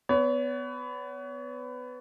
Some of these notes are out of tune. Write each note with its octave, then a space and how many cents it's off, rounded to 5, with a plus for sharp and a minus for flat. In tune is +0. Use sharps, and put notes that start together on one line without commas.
B3 +20 C#5 +35